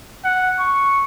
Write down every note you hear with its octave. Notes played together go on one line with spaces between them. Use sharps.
F#5
C#6